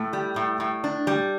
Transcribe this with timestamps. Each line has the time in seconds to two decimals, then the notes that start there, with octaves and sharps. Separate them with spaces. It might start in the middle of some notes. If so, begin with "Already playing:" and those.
Already playing: A2 A3
0.13 G3
0.36 A2
0.60 A2
0.84 D4
1.07 G3